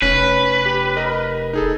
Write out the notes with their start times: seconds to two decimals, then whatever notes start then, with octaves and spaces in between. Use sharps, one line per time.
0.02 F1 C#4 B4
0.66 G4
0.97 A#4 D#5
1.53 D#4 G#4 A4